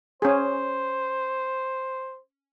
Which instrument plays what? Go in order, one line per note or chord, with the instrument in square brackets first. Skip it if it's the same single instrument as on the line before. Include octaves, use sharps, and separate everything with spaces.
[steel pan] C#4 G#4 [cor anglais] C5